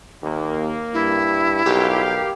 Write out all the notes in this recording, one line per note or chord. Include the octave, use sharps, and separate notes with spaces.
D#2 A#3
G2 E4
B1 G4 A#4 F5